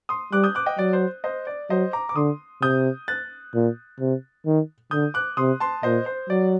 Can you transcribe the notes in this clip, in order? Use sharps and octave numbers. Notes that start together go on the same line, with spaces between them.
C6 D#6
G3 D6 F#6
D#6 G6
D6 F#6
D#5 G5
F#3 D5
C5
C5 D#5
D5
F#3 C5 D#5
A#5 D6
D6
D3 C6 D#6
C3 D#6 G6
F#6 A6
A#2
C3
D#3
D3 D#6 G6
D6 F#6
C3 C6 D#6
A5 C6
A#2 C5 D#5
C5
F#3 D5